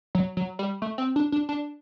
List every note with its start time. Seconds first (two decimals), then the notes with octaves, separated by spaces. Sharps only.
0.15 F#3
0.37 F#3
0.59 G3
0.82 A3
0.98 C4
1.16 D4
1.32 D4
1.49 D4